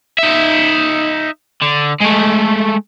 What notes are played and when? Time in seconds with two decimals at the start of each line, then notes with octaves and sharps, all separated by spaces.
0.18 D#4 E5
1.62 D3
2.00 G#3 A3